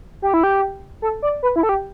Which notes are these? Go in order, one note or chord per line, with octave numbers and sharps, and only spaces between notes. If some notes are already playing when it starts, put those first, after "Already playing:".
G4
E4
G4
A4
D5
B4
E4
A4
G4